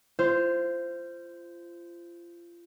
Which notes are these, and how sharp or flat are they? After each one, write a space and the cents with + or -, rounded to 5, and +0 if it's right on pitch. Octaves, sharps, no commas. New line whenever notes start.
F4 -30 C5 -5